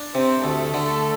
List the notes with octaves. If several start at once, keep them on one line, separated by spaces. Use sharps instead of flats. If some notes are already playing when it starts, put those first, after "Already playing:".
Already playing: D4
C3 C4 C5
D2 A3 A4
D3